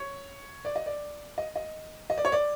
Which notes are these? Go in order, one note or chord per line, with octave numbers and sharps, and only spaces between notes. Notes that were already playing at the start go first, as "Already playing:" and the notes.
Already playing: C#5
D5
D#5
D5
D#5
D#5
D#5
D5
C#5
D5